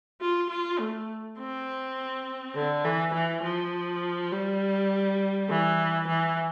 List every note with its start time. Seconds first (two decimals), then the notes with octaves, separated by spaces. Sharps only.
0.21 F4
0.49 F4
0.79 A3
1.38 C4
2.55 D3
2.85 E3
3.14 E3
3.43 F3
4.32 G3
5.49 E3
6.07 E3